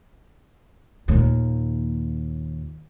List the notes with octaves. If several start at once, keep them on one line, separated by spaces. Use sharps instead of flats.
D#2 A#2